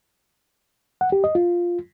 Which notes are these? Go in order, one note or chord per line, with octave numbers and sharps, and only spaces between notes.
F#5
G4
D#5
F4